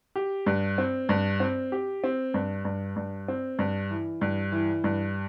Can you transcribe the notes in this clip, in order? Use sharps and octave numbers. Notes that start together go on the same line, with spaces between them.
G4
G2
C4
G2
C4
G4
C4
G2
G2
G2
C4
G2
E3
G2
E3
G2